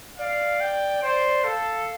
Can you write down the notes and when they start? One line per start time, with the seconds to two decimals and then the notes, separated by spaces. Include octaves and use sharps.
0.18 D5 F5
0.61 G5
1.02 C5 D5
1.44 A4 F5